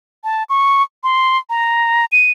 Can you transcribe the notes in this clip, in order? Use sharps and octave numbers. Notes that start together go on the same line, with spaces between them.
A5
C#6
C6
A#5
D#7